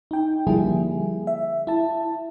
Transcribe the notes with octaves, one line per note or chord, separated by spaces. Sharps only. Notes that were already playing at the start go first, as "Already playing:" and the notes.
D#4 G5
D3 F3 G3 A#3 E4 G#4
E5
E4 A5